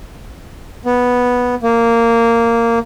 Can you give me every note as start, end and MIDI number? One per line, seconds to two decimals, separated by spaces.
0.85 1.55 59
1.63 2.79 58